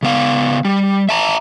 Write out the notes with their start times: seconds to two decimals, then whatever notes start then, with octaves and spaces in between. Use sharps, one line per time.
0.03 C#3 B3 F5
0.65 G3
1.09 E5 A5 A#5